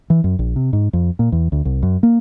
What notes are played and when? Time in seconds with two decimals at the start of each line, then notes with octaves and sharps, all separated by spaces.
0.10 E3
0.24 F#2
0.39 A#1
0.56 C3
0.73 G#2
0.93 F2
1.19 A#2
1.32 E2
1.52 D2
1.65 C2
1.83 F#2
2.03 A#3